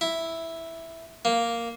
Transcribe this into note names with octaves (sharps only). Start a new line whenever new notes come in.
E4
A#3